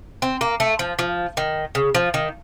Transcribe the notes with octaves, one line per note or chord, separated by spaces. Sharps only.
C4
A#3
A3
F3
F3
D#3
C#3
F3
D#3